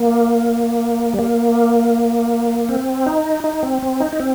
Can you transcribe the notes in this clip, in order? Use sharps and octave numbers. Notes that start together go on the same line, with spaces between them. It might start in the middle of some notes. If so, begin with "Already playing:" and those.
Already playing: A#3
G3
A#3
C4
D#4
D#4
C4
C4
D#4
D#4
C4